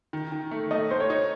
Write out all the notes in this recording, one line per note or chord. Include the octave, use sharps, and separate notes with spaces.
D#3
D#3
A3
A3 D#5
A3 C5
C#5
D#4